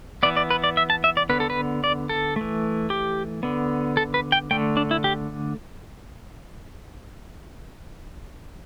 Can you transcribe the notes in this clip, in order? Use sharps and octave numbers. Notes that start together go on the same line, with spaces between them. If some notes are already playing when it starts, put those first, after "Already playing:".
E3 B3 D5
D5
B4
D5
E5
A5
E5
D5
D3 B3 B4
A4
B4
D5
A4
E3 A3
G4
D3 B3
A4
B4
G5
D3 A3 G5
D4
E4
G4